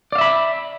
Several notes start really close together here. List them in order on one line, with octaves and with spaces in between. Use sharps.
D5 F5 E5 B5